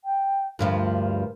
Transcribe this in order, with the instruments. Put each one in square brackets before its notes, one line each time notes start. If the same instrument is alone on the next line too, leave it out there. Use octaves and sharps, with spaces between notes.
[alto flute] G5
[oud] D2 G2 F3 [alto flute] A#4